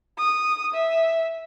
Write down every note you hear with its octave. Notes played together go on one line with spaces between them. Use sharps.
D#6
E5